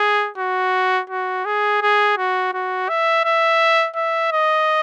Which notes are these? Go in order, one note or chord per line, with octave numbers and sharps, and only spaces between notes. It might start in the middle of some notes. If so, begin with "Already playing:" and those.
Already playing: G#4
F#4
F#4
G#4
G#4
F#4
F#4
E5
E5
E5
D#5